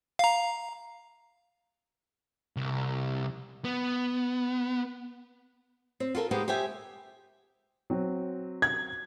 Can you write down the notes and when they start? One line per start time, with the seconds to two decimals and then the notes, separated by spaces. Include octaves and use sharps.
0.19 F5 A#5
2.56 C2
3.65 B3
6.00 C4
6.15 F4 F#4 A4 A#4
6.31 G#3 A#3 B3 D#4 G4 C5
6.48 G4 C5 E5 G5 G#5
7.90 F#3 C4
8.62 G#6